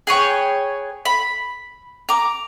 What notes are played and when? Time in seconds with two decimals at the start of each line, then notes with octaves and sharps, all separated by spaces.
0.07 G#4 B4 C#5 G5
1.05 B5
2.09 A#5 D6